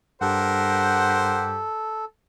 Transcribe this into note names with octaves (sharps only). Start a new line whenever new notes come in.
G2 G4 A4 A#4 C5 F#5